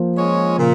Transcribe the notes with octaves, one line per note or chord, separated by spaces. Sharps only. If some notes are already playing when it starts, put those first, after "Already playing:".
Already playing: F3 A#3
G#3 C#4 F4 C#5
A#2 C#3